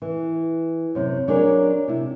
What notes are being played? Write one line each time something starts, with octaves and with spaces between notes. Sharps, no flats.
E3
F#2 C3
F#3 D4 G#4 A#4 C#5
C3 E4